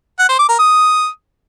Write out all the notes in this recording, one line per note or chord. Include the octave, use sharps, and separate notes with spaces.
F#5
C5
D6
A#4
D#6